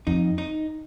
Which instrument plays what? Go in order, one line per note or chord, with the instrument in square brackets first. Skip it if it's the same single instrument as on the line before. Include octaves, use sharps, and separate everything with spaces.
[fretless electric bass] F2 [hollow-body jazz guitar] D#4
[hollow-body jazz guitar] D#4